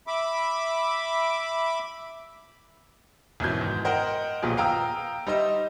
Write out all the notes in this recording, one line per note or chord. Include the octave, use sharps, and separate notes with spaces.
E5 B5 D6
G#1 F#2 B2 E3 G6
G#2
A#4 C5 D#5 F#5 G5
D#1 B1 A#2 F3 B3 G#4
F5 G5 A#5 D#6 E6
G3 D#4 C5 D#5 E5